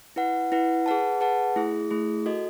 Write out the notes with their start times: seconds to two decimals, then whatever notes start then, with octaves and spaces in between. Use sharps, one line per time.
0.16 E4 B4 F#5
0.52 E4 B4 F#5
0.86 G#4 B4 F#5 A5
1.21 G#4 B4 F#5 A5
1.56 A3 E4 G#4
1.91 A3 E4 G#4
2.26 F#4 A4 D#5